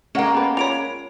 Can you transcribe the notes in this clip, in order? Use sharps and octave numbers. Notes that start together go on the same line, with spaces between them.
G#3 A#3 C#4 F#5 G5
B3 B4
F4 C#5 D5 B5 D7 F7